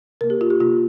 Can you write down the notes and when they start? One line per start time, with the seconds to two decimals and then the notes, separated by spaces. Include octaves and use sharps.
0.21 C3 A#3 A#4
0.30 G4
0.41 F4
0.50 G4
0.60 C3 A#3 F4